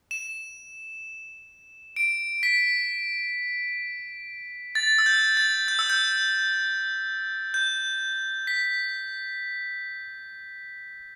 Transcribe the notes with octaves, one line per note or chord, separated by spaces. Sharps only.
E7
D7
B6
A6
E6
G6
A6
G6
E6
G6
G6
B6